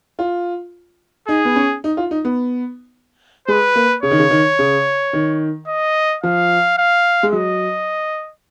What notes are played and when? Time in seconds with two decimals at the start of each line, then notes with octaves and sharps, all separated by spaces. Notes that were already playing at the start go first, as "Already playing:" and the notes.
0.19 F4
1.28 D#4 G#4
1.45 B3
1.56 C#4
1.84 D#4
1.97 F4
2.11 D#4
2.25 B3
3.48 G#3 B4
3.75 A#3
4.03 C#3 C#5
4.11 D#3
4.19 C#3
4.31 D#3
4.59 C#3
5.13 D#3
5.68 D#5
6.23 F3 F5
6.78 F5
7.23 G#3
7.33 F#3 D#5